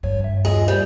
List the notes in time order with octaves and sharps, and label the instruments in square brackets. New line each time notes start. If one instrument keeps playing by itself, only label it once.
[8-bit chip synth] G#1 C#5 [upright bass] G2
[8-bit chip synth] E5
[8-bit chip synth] D#2 F4 D#5 [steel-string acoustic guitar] G#4
[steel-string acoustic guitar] G3 [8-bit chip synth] C5